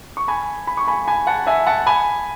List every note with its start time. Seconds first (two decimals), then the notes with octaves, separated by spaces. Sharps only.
0.17 C#6
0.28 G#5 B5
0.67 B5
0.77 C#6
0.88 G#5 B5
1.07 G#5 B5
1.27 F#5 A5
1.47 E5 G#5
1.66 F#5 A5
1.86 G#5 B5